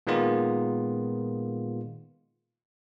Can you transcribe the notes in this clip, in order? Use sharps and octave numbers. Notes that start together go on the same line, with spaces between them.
A#2 D#3 G#3 A#3 B3 F4